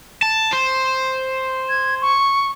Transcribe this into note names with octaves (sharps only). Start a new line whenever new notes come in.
A5
C5
G#6
C#6